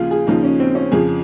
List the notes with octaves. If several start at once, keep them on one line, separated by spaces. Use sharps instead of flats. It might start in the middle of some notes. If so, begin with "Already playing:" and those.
Already playing: D#2 C#3 F3 F4 G#4
G#4
D#2 C#3 F3 D#4
C#4
C4
C#4
F2 C#3 F3 G#4